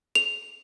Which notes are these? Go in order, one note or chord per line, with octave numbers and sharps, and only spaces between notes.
F7